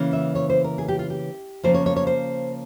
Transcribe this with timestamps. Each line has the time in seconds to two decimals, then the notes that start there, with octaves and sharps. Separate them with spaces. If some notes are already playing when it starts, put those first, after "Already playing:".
Already playing: C#3 E3 A#3
0.13 E5
0.35 C#5
0.50 C5
0.64 A#4
0.78 G#4
0.88 G4
0.99 F4
1.10 G4
1.63 C#3 F3 A#3 C5
1.74 C#5
1.86 C#5
1.96 C#5
2.07 C5